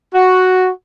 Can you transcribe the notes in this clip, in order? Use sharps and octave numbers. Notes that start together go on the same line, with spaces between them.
F#4